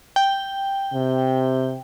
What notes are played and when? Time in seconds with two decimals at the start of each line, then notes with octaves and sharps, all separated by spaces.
0.16 G5
0.93 C3